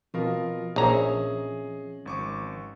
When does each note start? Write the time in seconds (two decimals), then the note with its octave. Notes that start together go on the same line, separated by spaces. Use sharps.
0.14 B2 F3 C4 F4 A#4 F5
0.76 A#1 C#4 G#4 D#5 E5 A#5
2.06 G#1 C#6 D6